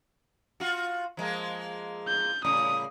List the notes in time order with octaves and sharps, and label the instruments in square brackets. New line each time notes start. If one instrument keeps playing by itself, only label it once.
[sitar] F4 F#4
F3 G#3 A#3
[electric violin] G6
[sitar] A2 C#3 G3 [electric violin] D#6